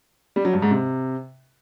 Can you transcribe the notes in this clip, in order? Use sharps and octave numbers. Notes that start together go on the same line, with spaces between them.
G3
F#3
G2
G#2
C3